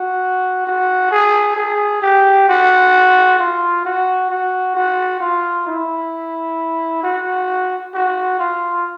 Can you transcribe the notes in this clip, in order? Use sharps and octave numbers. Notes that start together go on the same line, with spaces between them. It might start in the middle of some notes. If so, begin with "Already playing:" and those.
Already playing: F#4
F#4
G#4
G#4
G4
F#4
F4
F#4
F#4
F#4
F4
E4
F#4
F#4
F4